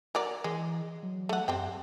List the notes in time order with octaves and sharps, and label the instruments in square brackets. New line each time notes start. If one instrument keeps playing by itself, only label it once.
[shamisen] F#3 A#4 D5
[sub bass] E3 [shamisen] G#3
[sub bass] F#3
[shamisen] A3 F#5
[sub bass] F#2 [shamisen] G3 C4 G5